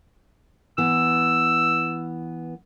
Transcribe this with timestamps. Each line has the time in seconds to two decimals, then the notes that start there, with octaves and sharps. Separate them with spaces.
0.78 E3 B3 E6